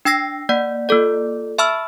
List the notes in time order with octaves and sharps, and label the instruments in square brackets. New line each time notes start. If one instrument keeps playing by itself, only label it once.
[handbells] D4 G5 E6 A#6 C7
A#3 D5 F#5
A#3 F4 A4 D5
E5 A5 B5 C#6 E6 F6